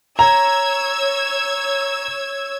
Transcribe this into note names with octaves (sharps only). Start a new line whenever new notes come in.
C#5 A#5 E6 G#6